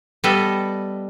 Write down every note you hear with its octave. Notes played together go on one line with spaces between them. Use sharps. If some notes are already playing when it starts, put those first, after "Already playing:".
G3 B3 A4 D#5 E5